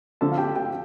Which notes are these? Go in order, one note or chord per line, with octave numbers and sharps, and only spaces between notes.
D3 F3 A3 A4 A5
F5
G4 G5
G4 G5